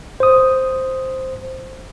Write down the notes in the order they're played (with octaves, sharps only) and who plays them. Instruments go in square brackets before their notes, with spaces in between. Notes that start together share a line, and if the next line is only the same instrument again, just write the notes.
[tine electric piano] C5 D#6